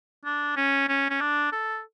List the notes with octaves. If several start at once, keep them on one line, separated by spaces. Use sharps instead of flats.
D4
C#4
C#4
C#4
D4
A4